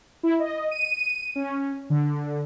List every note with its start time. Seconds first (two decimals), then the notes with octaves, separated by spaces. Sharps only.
0.23 E4
0.39 D#5
0.71 D#7
1.35 C#4
1.90 D3